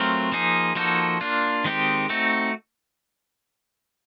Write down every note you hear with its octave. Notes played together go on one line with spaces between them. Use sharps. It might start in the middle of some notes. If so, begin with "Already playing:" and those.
Already playing: F#3 A3 C4 F4 A#4
F3 A#3 D#4 G#4
F3 A#3 D#4 F#4 A4
A#3 D4 F4
D#3 G#3 C4 D#4 G4
A3 C4 D#4 F#4